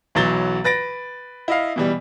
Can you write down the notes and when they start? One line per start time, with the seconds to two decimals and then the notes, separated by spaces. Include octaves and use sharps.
0.15 B1 E3 F#3 A6 G7
0.64 B4 A6 A#6 D7
1.48 E4 D#5 F5
1.76 B2 E3 G3